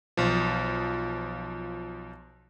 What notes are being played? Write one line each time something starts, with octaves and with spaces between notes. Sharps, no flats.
B1 F3